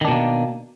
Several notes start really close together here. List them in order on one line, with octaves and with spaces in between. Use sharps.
D#3 D4 B2 A#3